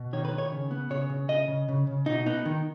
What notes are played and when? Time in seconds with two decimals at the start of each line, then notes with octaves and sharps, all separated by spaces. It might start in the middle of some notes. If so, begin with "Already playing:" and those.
Already playing: B2
0.13 D#3 C#5
0.25 B4
0.32 D#3
0.38 C#5
0.52 C#3
0.71 B3
0.90 C#3 C#5
1.10 C#3
1.28 C#3 D#5
1.48 C#3
1.68 C#3
1.87 C#3
2.06 B2 D#4
2.26 B3 D#4
2.46 D#3